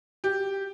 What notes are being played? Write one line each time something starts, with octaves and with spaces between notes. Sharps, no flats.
G4